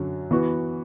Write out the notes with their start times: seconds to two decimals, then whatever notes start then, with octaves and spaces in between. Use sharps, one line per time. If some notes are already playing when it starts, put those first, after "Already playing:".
Already playing: F#2 D3 F#3
0.31 E3 B3 F#4